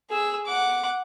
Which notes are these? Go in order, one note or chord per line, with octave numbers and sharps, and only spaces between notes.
G#4 E6
F#5 D6